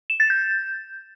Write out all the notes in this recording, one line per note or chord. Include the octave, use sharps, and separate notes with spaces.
E7
A6
G6